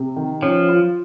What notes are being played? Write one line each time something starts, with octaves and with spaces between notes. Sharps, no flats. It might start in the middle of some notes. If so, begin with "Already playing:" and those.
Already playing: C3
D#3
F3 C#4
F4